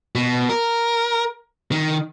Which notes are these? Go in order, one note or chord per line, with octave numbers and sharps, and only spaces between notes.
B2
A#4
D#3